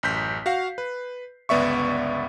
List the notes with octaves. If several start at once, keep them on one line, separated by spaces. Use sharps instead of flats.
A1 F#2 G6 B6
F#4 F5 C7
B4
G1 C#2 B3 D5 E5 C#6